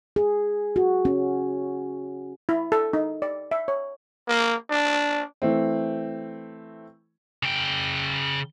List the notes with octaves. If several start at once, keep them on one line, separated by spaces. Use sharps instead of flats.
G#4
F#4
C#4
E4
A4
D#4
D5
E5
C#5
A#3
D4
E3 A3 C4
C#3 G5